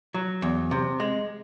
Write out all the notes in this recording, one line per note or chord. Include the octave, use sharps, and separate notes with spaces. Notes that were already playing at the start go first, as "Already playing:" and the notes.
F#3
E2
C3
G#3